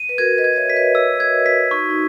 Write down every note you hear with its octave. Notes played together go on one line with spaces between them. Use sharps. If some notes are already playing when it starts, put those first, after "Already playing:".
Already playing: D#7
B4
F#4 A#4 G#6
B4 D#5
G#6
D#5
C#5 E5
B6
B4 D#5
C#5 E5 E6
B4 D#5 G#6
F#4 A#4 B6
D#4 F#4 C#6
D#4